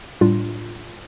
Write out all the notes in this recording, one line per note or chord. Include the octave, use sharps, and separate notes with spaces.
A2 G3 D4 F4